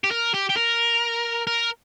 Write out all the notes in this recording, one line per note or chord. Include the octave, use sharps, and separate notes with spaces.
G4
A#4
G4
G4
A#4
A#4